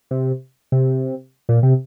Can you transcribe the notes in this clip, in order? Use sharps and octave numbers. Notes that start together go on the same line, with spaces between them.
C3
C3
A#2
C3